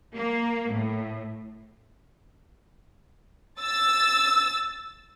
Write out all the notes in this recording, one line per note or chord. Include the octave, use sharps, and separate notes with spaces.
A#3
A2
E6 A6